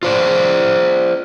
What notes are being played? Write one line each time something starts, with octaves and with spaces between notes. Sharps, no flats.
F4 C5 D5